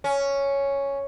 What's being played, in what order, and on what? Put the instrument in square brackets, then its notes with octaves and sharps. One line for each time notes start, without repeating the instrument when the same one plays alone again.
[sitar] C#4